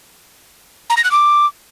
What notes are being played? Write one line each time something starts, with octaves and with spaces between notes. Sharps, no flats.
A#5
A#6
F#6
D6